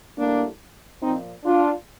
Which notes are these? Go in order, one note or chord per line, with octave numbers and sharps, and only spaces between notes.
A2 G3 A#3 D4
A#2 F3 C4 D#4
D4 F4